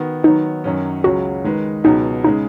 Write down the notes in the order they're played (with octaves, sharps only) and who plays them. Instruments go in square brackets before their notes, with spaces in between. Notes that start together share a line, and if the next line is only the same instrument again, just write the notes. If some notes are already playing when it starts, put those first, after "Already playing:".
Already playing: [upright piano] D#3 B3 F#4
[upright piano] D#3 F#3 B3 [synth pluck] D#4
[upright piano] F#2 D#3 F#3 C#4
[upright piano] C#2 C#3 F#3 [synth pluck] F#4
[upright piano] D#3 G#3 D#4 B4
[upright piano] C#2 B2 F#3 [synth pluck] D#4
[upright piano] C#3 G#3 [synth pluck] D#4